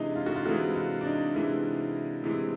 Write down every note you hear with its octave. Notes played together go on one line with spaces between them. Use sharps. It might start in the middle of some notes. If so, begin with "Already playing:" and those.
Already playing: C3 E3 G#3 D4 D#4
F4
F#4
F4
C3 E3 G#3 F#4
F4
D4
D#4
C3 E3 G#3 E4
C3 E3 G#3